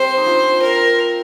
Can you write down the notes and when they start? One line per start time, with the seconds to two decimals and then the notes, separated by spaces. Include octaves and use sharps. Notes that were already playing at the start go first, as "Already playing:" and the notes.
Already playing: G3 C4 C5
0.17 D#4
0.26 D4 F4
0.62 A#4